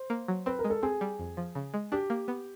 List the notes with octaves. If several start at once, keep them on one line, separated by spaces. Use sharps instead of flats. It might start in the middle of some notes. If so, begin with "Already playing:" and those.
Already playing: C5
A#3
F#3
C4 B4
A#4
G#3
A4
C4 G#4
G3
F2
F3
C#3
G#3
D4 G4
A#3
B3